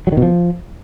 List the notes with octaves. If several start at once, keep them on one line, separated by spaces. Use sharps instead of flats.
F#3
D#3
B2
F3